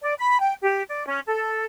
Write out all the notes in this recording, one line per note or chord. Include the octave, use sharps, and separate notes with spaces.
D5
B5
G5
G4
D5
C#4
A4